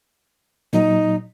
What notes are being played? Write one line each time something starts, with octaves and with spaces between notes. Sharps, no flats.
A#2 F#3 D#4